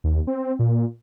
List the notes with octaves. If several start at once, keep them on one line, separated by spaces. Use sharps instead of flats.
D#2
C4
A#2